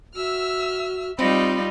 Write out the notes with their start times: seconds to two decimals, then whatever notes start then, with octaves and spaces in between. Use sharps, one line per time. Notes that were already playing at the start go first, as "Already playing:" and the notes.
0.15 F#4 E5 E6 F6
1.19 G3 C4 D#4 F4 D#5 F5 B5